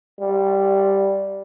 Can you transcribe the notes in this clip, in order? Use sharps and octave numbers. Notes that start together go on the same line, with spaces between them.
G3